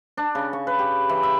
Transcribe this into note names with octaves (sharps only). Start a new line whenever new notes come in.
D4
C#3
C#6
B4
G4
E3
E5